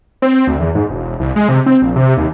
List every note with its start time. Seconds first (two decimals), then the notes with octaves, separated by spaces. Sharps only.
0.22 C4
0.47 D2
0.60 E2
0.75 G#2
0.90 E1
1.20 C2
1.36 G#3
1.49 C3
1.66 C4
1.82 A#1
1.96 C3
2.17 D#2